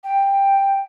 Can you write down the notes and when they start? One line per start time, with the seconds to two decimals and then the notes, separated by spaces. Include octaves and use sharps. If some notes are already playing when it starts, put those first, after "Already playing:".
0.04 G5